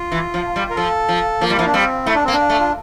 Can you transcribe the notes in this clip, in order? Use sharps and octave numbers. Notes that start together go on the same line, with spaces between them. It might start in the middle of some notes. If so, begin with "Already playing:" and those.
Already playing: F4
E3
F3
G3
A#4
F3 A4
F3
F3 A#3
G3 F4
F3 E4
D4
G3 C4
A3 E4
D4
A#3 C4
D4
A3
F4